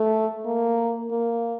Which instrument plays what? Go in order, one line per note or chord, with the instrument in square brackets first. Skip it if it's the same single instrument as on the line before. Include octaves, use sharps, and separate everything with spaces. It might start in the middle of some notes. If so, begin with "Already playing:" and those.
Already playing: [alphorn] A3
A#3
A#3